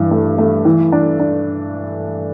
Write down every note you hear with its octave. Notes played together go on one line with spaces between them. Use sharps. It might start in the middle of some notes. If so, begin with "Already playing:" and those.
Already playing: G2 E3
A3
A3
E3
D4
D4